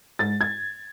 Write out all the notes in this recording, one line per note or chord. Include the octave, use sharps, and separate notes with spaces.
G#2 A6
G#6